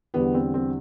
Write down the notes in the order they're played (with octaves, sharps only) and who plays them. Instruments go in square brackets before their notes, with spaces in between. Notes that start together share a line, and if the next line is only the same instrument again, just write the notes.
[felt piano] E2 D3 G3 B3
C4
C4